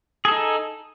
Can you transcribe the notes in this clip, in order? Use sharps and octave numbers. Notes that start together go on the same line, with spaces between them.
D#4 G#4 A4